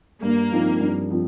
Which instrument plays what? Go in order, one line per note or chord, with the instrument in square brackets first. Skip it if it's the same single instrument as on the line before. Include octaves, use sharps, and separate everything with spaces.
[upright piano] G2 [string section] A#3
[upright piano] F3 C4 D#4
G2
F3 C4